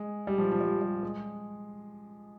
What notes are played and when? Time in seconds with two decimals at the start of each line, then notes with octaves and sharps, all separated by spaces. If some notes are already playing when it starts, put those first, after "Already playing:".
Already playing: G#3
0.27 G3
0.38 F3
0.52 F3
0.61 G3
0.81 G3
1.03 G#3